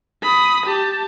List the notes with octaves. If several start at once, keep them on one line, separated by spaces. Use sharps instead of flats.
B5 D#6
G4 A5